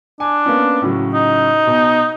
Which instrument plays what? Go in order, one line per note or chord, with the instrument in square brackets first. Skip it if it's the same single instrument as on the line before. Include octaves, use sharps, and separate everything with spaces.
[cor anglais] D4 [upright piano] G#5
[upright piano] A#3 B3 C#4
A2 C#3 F#3
[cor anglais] D#4
[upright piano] B2